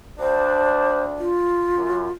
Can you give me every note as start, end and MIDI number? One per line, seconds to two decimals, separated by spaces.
0.19 1.31 38
0.19 1.31 62
0.19 1.02 72
1.19 2.10 65
1.76 2.06 42